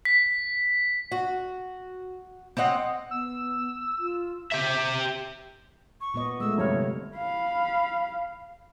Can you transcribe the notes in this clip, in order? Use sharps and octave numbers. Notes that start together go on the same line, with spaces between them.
B6
F#4
C4 C#5 D#5 F#5
B3 E6
F4
G4 E5
C#6
A#2 B3 D#5
G#3 A3 E6
G1 C3 C#5 F6
F5 B5